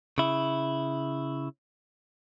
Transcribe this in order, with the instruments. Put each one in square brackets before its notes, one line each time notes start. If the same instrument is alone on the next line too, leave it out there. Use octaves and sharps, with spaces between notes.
[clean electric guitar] C#3 E4